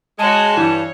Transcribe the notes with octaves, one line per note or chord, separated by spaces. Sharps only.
G#3 F#4 C#5 A5
G2 E3 C#5